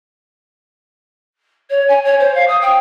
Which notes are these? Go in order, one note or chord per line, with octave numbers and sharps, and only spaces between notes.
C#5
G#5
C#5
C5
F5
D#6
G5